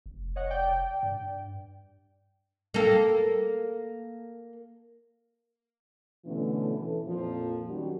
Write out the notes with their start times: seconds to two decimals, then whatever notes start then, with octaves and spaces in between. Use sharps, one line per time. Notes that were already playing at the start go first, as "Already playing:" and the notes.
0.06 F1
0.36 C#5 D#5 F#5
0.50 D5 G5
1.03 G2
2.74 A#3 A4
6.25 B2 D3 E3 A3 B3 C#4
6.73 E3 A4
7.04 F2 A#2 F3
7.68 D#3 F#3 G3 C#4 F#4